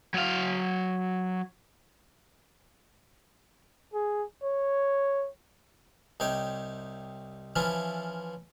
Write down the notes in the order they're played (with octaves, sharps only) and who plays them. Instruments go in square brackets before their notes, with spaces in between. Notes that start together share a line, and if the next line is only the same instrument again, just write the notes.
[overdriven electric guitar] F#3 F5
[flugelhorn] G#4
C#5
[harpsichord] C2 C3 D#4 C#5 G5
E3 F3 C#4 E4 F4